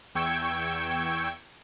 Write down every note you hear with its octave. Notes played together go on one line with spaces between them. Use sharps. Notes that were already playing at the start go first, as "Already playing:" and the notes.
E2 G5 C#6 E6 G#6